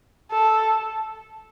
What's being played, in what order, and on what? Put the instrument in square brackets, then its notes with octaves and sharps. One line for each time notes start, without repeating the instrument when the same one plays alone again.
[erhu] A4